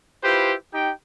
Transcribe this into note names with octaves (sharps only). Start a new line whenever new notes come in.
E4 F4 G4 B4 C5
D#4 G4 G5